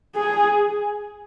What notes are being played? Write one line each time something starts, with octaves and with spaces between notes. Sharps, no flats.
G#4